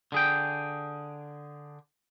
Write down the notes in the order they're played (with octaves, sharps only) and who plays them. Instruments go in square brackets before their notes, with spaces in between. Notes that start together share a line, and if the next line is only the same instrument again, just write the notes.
[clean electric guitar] D3 G#4 G5